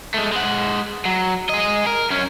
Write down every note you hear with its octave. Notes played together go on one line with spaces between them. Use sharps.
G#3 A3
G#3 F#5
F#3
G#4 D#5
A#4
F#2 C#4